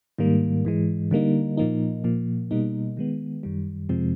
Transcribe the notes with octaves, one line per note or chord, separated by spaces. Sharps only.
G#2 D#3 G3 A#3
G#2 E3 G#3
D3 G3 A#3 D#4
A#2 F3 A#3 D#4
A#2 F3 A#3
B2 G3 A#3 D#4
D#3 G#3 B3
F#2 D#3 G3
F2 C3 F3 G#3 C4